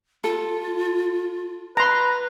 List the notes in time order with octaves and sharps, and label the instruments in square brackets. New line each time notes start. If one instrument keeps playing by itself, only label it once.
[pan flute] F4 [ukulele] A4
[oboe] B4 [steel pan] A#5 C6